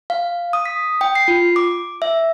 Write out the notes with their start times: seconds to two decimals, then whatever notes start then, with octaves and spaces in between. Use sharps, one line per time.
0.10 F5
0.53 D#6
0.65 B6
1.01 G5
1.15 C7
1.28 F4
1.56 D6
2.02 E5